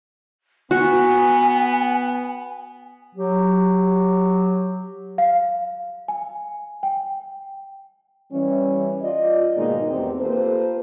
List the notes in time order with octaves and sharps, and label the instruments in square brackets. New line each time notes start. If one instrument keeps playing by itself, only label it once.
[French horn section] B3 [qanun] F#4 [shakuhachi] G#5
[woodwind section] F#3 G4
[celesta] F5
G#5
G5
[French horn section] E3 G3 C#4
F4 D5 D#5
G#2 B2 D#3 G#3 A#3 D#4
E2 A3 C4 G4
A#3 F4 G4 A4 B4 C5